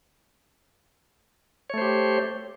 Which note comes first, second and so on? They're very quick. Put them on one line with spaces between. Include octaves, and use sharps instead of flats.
C#5 A3 C5 G4